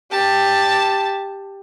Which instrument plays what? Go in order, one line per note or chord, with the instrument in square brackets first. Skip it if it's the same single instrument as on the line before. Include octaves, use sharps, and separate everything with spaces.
[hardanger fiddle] G4 A5